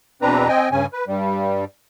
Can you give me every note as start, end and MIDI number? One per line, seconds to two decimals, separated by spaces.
0.22 0.48 40
0.22 0.48 47
0.22 0.48 60
0.22 0.48 62
0.22 0.48 71
0.22 0.48 82
0.48 0.69 60
0.48 0.69 75
0.48 0.69 79
0.48 0.69 80
0.72 0.86 43
0.72 0.86 49
0.72 0.86 61
0.72 0.86 80
0.93 1.05 71
1.08 1.65 43
1.08 1.65 55